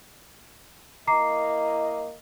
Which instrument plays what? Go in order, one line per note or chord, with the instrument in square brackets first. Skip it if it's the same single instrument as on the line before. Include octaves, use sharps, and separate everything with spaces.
[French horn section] A#3 E4 D#5 [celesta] A#5 D6 C7